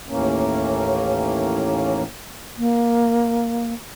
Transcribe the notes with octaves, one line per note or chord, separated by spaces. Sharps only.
D#2 A2 E3 A#3 C#4
A#3